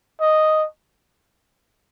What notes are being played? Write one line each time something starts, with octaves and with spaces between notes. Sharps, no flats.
D#5